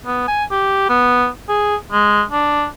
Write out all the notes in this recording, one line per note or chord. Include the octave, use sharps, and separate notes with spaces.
B3
G#5
G4
B3
G#4
G#3
D4